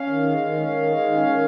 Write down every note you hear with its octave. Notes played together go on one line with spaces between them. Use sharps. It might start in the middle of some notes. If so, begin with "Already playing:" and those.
Already playing: C#4 F5
D#3
G#3
D#3
C#4
D#3
G#3
D#3
C#4
D#3